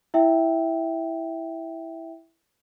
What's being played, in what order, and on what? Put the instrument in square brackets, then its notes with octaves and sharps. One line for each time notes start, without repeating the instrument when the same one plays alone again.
[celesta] E4 E5 G5